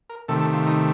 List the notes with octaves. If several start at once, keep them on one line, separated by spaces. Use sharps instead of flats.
A#4
C3 D#3 A3 A4
A4
F4
D#4